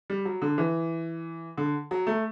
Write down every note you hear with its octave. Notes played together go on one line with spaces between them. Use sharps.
G3
F#3
D3
E3
D3
F#3
A3